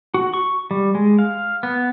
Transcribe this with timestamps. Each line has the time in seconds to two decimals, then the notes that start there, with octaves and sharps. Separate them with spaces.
0.14 F#4
0.34 C#6
0.71 G3
0.95 G#3
1.19 F5
1.63 B3